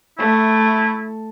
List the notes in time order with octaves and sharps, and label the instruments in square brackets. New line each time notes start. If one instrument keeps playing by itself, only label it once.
[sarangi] A3 [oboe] E4